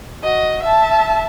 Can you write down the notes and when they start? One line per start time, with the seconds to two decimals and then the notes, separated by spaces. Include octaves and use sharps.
0.22 F#4 D#5
0.62 E5 A5